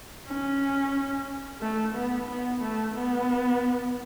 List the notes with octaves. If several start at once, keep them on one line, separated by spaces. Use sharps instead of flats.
C#4
A3
B3
B3
A3
B3